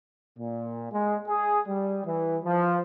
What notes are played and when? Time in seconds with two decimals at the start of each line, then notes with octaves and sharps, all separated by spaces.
0.38 A#2
0.91 G#3
1.28 G#4
1.66 G3
2.05 E3
2.43 F3